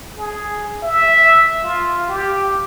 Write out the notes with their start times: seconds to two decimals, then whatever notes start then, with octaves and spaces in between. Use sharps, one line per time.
0.17 G#4
0.83 E5
1.64 F4
2.09 G4